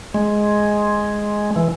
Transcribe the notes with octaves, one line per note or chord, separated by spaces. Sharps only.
G#3
E3